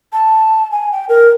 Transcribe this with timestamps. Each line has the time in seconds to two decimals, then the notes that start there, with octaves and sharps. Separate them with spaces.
0.13 A5
0.72 G#5
0.92 G5
1.09 A#4